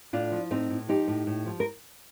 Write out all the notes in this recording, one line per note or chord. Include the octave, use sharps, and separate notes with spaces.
A2 D4 F4
F3
A2 C4 D#4
A2
F3 D#4 G4
A2
A2
F3
A#4